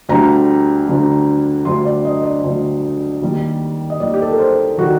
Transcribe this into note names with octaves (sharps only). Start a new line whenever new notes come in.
D2 D3 G3 A#5
D2 D3 G3
D2 D3 G3 C6
D5
D#5
D5
D2 D3 G3
D#2 D#3 G3
D#5
D#2 D#3 G3 D5
G4
A4
A#4
C5
D#3 G3 F#4